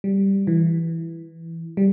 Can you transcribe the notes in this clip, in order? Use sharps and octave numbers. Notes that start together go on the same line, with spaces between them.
G3
E3
G3